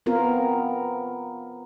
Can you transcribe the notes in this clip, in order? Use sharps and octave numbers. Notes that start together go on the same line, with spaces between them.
B3 C4 F4 A#4